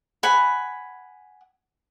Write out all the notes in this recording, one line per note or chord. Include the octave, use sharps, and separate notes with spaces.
F#5 G#5 B5